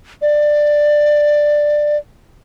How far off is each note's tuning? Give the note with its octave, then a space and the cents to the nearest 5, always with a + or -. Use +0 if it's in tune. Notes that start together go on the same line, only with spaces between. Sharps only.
D5 +10